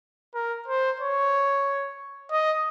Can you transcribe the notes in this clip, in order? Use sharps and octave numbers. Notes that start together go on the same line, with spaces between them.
A#4
C5
C#5
D#5